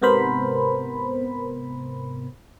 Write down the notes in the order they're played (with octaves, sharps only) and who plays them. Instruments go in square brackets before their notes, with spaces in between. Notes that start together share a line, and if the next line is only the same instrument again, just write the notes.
[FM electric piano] G#2 C3 B3 A#4 C5 B5